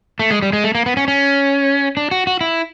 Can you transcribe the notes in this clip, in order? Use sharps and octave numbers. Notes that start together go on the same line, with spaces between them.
A3
G#3
G3
G#3
A3
A#3
B3
C#4
C#4
D4
F#4
F#4
E4